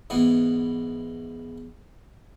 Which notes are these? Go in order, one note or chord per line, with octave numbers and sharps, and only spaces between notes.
G#2 E3 B3